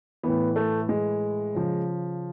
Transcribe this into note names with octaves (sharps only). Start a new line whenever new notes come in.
A2 E3 B3
A3
G#3
C#3 F3